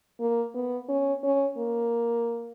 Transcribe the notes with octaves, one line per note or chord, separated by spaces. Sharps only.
A#3
B3
C#4
C#4
A#3